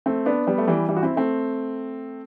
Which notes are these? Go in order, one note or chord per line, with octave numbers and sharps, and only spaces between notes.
A3 C4
B3 D4
G3 B3
A3
E3 G3
E3 G3
F#4
C4 E4
A3 C4